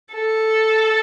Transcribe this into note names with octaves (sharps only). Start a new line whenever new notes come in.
A4